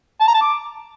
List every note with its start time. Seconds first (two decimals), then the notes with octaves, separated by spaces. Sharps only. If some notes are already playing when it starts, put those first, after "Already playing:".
0.21 A5
0.27 A#5
0.34 A5
0.41 D6